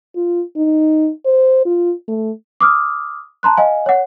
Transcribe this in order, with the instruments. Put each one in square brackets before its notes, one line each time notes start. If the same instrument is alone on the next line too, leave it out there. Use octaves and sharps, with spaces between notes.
[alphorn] F4
D#4
C5
F4
A3
[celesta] D6 D#6 F6
A5 A#5 C6 F#6
D#5 F5 G#5
C#5 F#5